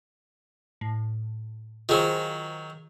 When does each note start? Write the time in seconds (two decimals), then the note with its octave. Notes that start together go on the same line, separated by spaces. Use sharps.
0.81 A2
1.89 D#3 F#3 F4 G#4 C5